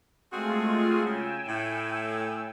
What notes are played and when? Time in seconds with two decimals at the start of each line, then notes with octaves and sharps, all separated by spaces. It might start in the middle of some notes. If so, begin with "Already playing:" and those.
0.32 G#3 A3 C4 F4 F#4 G#4
1.06 C#3 G5 G#5 E6
1.48 A2